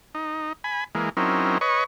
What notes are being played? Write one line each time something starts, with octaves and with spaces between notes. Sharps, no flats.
D#4
G#5 B5
E3 G#3 A#3
F#3 C4 C#4 D#4 E4 A#4
B4 C#5 D#5 C#6